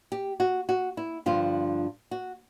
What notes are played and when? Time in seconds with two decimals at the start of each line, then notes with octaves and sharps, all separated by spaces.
0.12 G4
0.40 F#4
0.69 F#4
0.97 E4
1.26 G2 D3 F3 F4
2.11 F#4